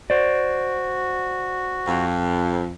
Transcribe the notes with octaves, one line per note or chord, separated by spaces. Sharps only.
F#4 C5 D5
F2